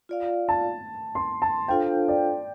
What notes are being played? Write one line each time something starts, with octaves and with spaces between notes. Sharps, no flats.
F4 D5 F5
A5
C6
A5
D4 F4 A4 C5 F5 G5
D5